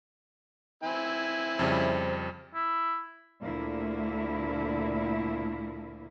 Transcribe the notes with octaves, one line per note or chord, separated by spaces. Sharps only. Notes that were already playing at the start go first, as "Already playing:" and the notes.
C4 E4 G#5
F2 C#3 G3 C5
E4
D2 A#2 D3 A3 A#3 E4